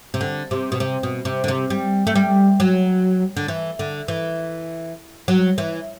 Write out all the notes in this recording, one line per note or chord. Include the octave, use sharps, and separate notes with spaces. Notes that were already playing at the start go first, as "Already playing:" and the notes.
C3
D3
C3
B2
C3
B2
C3
D3
C3
G3
A3
G3
F#3
D3
E3
D3
E3
F#3
E3